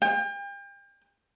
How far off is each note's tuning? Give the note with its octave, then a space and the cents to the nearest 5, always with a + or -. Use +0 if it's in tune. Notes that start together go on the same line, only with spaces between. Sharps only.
G5 +35